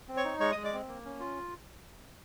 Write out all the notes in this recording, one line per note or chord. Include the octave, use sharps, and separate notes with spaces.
C4
C#5 C#6
D#4
G#3 C#5 C#6
G#3 D#5 D#6
D5 D6
C4
A#3
C#4
F4